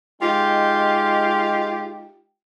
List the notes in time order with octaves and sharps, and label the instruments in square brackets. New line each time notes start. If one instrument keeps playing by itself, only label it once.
[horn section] G#3 D#4 F4 G4 G5